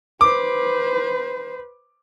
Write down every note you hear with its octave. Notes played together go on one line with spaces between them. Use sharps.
B4 C5 D6